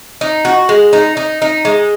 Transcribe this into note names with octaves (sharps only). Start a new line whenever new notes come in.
D#4
F#4
G#3
D#4
D#4
D#4
G#3